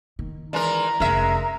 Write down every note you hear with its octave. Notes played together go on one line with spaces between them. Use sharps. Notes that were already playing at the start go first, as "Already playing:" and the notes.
D#3
E3 G#3 A#4 D5 A#5
F1 G#3 C#4 A#4 E5